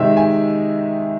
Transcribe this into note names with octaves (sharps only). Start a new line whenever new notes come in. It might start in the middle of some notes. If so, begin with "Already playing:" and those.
Already playing: C3 D#3 G#3 D#4 E5
G#5